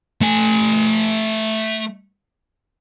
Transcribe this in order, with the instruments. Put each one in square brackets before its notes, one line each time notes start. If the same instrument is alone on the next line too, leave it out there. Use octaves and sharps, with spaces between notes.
[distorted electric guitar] A3 G#5